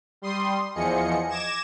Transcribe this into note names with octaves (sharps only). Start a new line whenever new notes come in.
G3 C6 D#6
E2 F3 G#4 D#5 C#7
D6 G#6 A#6 E7